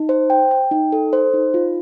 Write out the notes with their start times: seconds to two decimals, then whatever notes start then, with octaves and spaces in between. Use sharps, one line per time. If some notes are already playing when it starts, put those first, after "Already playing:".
Already playing: D#4
0.09 C5
0.30 G5
0.51 G5
0.71 D#4
0.93 A4
1.13 C5
1.34 D#4
1.54 F4